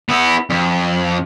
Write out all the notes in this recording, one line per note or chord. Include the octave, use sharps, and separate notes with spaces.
B3 E4
F2